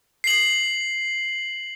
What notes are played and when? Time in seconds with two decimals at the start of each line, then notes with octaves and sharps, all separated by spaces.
0.24 C7 F#7